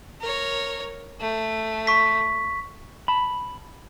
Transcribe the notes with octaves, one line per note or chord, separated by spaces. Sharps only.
A#4 C#5
A3
C#6 B6
A5 B5